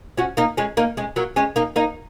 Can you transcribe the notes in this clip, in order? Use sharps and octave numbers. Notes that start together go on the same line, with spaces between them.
C#4 F#4
A#3 D#4
G#3 C#4
A#3 D#4
G#3 C#4
F#3 A#3
G#3 C#4
A#3 D#4
A#3 D#4